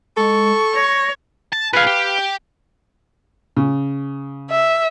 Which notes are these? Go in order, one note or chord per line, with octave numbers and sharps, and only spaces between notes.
G#3 A4 C#6
C#5 A#6
A5
A#2 G#4 B4 F5
G4
C#3
E5